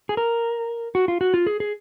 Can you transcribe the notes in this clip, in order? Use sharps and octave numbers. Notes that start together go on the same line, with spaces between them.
G#4
A#4
F#4
F4
F#4
F4
G#4
G#4